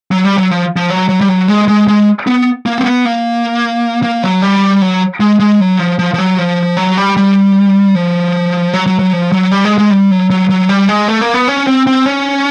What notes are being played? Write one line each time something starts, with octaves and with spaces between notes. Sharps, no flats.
F#3
G3
F#3
F3
F3
F#3
F#3
G3
F#3
G#3
G#3
G#3
B3
A#3
C4
B3
A#3
A#3
F#3
G3
F#3
G#3
G#3
F#3
F3
F3
F3
F#3
F3
F#3
G3
G3
F3
F#3
F#3
F#3
F3
F#3
G3
G#3
G#3
G3
F#3
F#3
F#3
G3
G#3
A3
A#3
B3
C#4
C4
C4
C#4